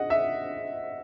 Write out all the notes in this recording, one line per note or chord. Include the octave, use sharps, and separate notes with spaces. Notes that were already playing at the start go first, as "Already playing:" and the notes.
Already playing: D#5 F#5
E5